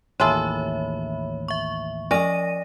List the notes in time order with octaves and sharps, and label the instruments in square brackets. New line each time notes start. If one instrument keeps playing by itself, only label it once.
[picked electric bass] A1 D#2 [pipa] F4 G#4 A4 [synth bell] C#5 E5 B5
[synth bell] E5 C#6
[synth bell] F3 A#6 D#7 [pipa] C#4 [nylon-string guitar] D5 D#5